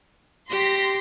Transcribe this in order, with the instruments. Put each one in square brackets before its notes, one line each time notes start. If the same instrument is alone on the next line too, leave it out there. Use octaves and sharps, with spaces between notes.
[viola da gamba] G4 [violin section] C6 A#6 B6